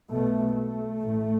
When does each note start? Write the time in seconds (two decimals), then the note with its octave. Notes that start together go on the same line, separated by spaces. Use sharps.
0.12 B1 B2 A3
0.56 A3
1.00 A1 A2